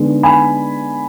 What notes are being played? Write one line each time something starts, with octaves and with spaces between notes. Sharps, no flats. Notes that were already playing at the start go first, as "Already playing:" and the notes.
Already playing: D3 G#3 B3 D#4
G#5 B5